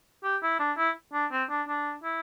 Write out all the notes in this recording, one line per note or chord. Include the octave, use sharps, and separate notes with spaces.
G4
E4
D4
E4
D4
C4
D4
D4
E4